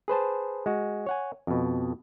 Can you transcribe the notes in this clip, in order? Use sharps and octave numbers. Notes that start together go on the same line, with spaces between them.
G#4 B4 C5 A5
G#3 F#4
C#5 F#5 G#5
F2 B2